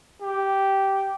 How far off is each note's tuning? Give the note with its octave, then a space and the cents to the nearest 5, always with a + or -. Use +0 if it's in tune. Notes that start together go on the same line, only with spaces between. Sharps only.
G4 -10